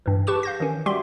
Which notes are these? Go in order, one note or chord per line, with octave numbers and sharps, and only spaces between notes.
G2 E3
G4 B4 A5 C#6 D6 E7
F5 G6 A#6
D#3 E3 C#4
G3 F#4 G4 E5 G5 C6